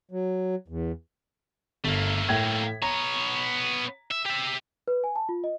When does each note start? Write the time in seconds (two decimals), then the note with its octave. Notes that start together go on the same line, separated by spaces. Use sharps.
0.11 F#3
0.68 E2
1.84 G1 A3 A#3
2.29 A2 G5 G#6
2.82 B3 C#5 A#5
4.11 E5
4.25 G4 E5
4.88 B4
5.04 G#5
5.16 A5
5.29 F4
5.44 D#5